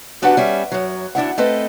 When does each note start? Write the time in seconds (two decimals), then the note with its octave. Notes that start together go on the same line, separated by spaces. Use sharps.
0.22 E2 D4 F#4 G4 B4 F#5
0.37 G3 C#4 E5
0.72 F#2 F#3
1.15 D2 D4 E4 F#5
1.38 A3 C4 A4 B4 D#5